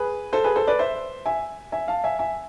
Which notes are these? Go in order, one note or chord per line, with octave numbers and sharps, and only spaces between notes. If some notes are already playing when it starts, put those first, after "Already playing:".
Already playing: G#4 B4
A4 C5
G#4 B4
A4 C5
B4 D5
C5 E5
E5 G#5
E5 G#5
F5 A5
E5 G#5
E5 G#5